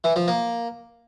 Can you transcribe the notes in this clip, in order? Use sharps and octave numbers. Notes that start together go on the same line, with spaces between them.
E3
F3
A#3